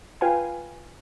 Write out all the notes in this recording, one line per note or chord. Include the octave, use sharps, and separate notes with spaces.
F4 B4 F5 G5 G#5